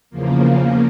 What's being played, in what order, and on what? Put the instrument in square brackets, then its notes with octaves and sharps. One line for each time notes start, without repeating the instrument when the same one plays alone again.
[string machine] E2 C#3 F3 A#3